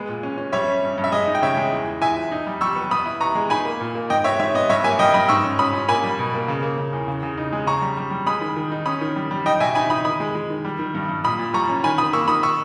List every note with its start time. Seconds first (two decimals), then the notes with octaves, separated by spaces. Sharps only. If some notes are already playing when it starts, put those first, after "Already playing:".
Already playing: G#3 B3
0.09 A#2
0.23 C#4
0.38 C#4
0.52 G3 C#5 E5
0.68 C#4
0.83 G2
0.98 G2
1.04 E5
1.12 G#3 D#5
1.27 D#4
1.35 G5
1.42 C#3 C#5 E5
1.57 G#3
1.72 E2
1.87 E2
2.01 E2 E5 G#5
2.17 E2
2.32 D#4
2.47 G3
2.61 G3 C#6 E6
2.76 B3
2.91 B3 B5 D#6
3.06 E4
3.21 B3 A#5 C#6
3.35 G#3
3.50 D#4 G#5 B5
3.65 A#3
3.81 A#2
3.95 A#3
4.10 G#2 D#5 G5
4.24 B3 C#5 E5
4.40 G#2 C#5 E5
4.54 B3 D#5
4.69 G2 C#5 E5
4.84 A#3 E5 G#5
4.99 G2 D#5 G5
5.14 G2 B5 D#6
5.29 G#2 C#6 E6
5.44 C#4
5.59 C#4 B5 D#6
5.73 C#4
5.89 A#3 G#5 B5
6.03 G3
6.19 B2
6.33 A#3
6.48 C#3
6.63 A#3
6.78 C#3
6.93 E2
7.08 C#3
7.23 C#3
7.37 D#4
7.53 G#3
7.66 C#3 A#5 C#6
7.82 G3
7.97 G3
8.11 G3
8.26 G#3 B5 D#6
8.41 D#3
8.57 D#3
8.71 D#4
8.85 C#4 B5 D#6
9.01 D#3
9.16 G3
9.31 G3
9.45 D#4 D#5 G5
9.60 B2 E5 G#5
9.75 D#4 G#5 B5
9.90 D#4 B5 D#6
10.05 D#3 B5 D#6
10.20 G#3
10.35 G#3
10.50 D#3
10.65 G3
10.79 D#3
10.95 G2
11.09 G2
11.24 A#2 B5 D#6
11.39 A#2
11.54 G3 A#5 C#6
11.69 C#4
11.84 D#3 G#5 B5
11.98 D#3 B5 D#6
12.13 A#3 C#6 E6
12.28 D#3 B5 D#6
12.43 C#6 E6